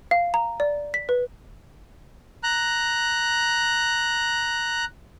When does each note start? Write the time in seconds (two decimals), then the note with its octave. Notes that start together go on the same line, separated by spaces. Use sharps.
0.11 F5
0.34 A#5
0.60 D5
0.94 B6
1.09 B4
2.43 A#5 F#6